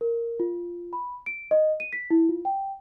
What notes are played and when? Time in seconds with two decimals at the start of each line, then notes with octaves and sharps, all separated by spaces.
0.01 A#4
0.40 F4
0.93 B5
1.26 D7
1.51 D#5
1.80 D#7
1.93 B6
2.10 E4
2.29 F4
2.45 G5